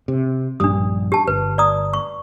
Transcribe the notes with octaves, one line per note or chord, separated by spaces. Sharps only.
C3
A#1 G2 G3 D4 D#6
G4 A5
G1 B4
D5 A#5 D#6
C#6